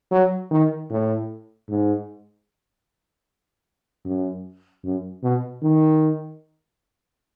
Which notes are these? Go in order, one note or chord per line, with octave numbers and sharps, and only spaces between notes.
F#3
D#3
A2
G#2
F#2
F#2
B2
D#3